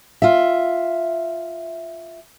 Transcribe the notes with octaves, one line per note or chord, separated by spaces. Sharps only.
F4 E5